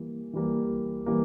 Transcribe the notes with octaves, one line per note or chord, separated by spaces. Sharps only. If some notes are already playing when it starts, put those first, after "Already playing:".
Already playing: E3 G3 A#3
E3 G3 A#3
E3 G3 A#3